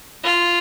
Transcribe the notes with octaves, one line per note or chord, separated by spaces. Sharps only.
F4